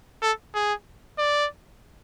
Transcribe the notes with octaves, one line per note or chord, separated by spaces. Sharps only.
A4
G#4
D5